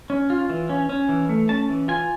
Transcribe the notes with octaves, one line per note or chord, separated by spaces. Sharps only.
C#4
F4
E3
C#4
C#4
E3
A3
C#4 A5
E3
F4 G#5